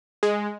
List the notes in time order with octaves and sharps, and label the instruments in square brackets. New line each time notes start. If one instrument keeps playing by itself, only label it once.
[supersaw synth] G#3